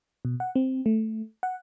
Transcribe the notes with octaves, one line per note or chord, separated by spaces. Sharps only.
B2
F#5
C4
A3
F#5